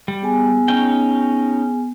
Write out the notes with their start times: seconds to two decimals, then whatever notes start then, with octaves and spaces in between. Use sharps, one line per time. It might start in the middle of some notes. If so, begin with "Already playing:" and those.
0.08 G3
0.22 B3 G#4 G#5
0.68 C#4 D#4 G5